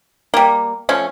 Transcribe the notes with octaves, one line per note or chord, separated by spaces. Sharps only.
G3 A#3
F3 A3 C#4